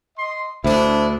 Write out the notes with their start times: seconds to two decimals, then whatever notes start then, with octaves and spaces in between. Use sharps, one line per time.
0.18 D#5 C6
0.64 D2 D4 E4 C5